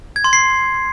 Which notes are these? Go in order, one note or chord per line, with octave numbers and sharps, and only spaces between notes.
G#6
C6
C7